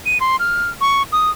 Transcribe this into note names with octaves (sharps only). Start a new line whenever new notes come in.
D#7
C6
F6
C#6
D#6